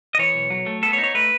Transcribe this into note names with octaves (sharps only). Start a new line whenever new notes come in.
D#5
E3 C#5
B1
F#3
A3
B3 A4
C#5
D#4
C#5
A3 B4